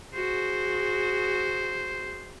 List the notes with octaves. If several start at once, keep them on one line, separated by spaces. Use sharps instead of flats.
F#4 G#4 C5